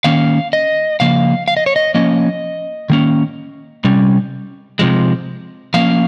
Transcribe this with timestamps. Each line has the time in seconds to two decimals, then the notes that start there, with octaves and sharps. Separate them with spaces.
0.04 D#3 A#3 C#4 F5
0.53 D#5
1.00 C#3 F3 A#3 F5
1.48 F5
1.57 D#5
1.66 C#5
1.76 D#5
1.95 F3 A#3 C#4 D#5
2.90 D#3 A#3 C#4
3.84 C3 G3 C#4
4.79 C3 F3 G#3
5.74 F3 A#3 C#4 F5